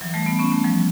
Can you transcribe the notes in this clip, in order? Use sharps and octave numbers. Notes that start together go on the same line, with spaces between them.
E3 F#3
G3 A3
A3 B3
B3 C#4
A3 B3
F3 G3